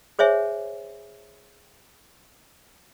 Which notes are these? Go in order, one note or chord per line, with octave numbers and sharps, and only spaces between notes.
G#4 C5 C#5 E5 G#5